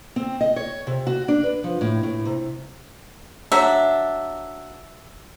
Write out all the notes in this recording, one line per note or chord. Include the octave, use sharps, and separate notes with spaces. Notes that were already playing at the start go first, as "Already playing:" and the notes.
C4
D#5
C#5
C3
F#4
D4
B4
F3
A2
A2
C3
F#3 D4 E5